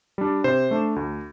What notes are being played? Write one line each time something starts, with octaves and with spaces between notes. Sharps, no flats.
G3 D4
C3 C5
A3 D4
D2